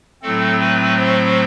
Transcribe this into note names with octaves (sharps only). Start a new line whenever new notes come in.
A2 F#3 A3 C4 A4
B4
C5